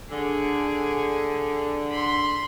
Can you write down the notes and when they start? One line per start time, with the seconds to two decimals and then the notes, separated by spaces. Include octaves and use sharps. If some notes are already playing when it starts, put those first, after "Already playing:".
0.11 D3 G#4
1.91 B5 C6